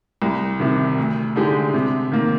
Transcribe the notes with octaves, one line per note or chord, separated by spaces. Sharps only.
C2
C3 D#3
D2
D3 G#3 D#4 G4
C3
D#3 A#3